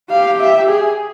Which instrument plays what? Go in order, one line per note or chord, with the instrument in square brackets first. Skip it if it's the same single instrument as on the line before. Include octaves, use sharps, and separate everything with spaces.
[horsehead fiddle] G4 [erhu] F5
[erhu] E5
G#4